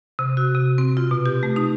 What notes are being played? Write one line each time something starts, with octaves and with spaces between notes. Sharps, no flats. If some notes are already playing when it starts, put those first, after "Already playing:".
C3
F#4
C3
C4
F4
B2
G4
A3
D#4